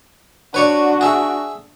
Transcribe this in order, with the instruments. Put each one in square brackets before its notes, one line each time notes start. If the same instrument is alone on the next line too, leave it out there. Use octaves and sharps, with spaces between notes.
[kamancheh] D4 F#4 [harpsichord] B4 C#5 D5
[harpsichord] G#4 E5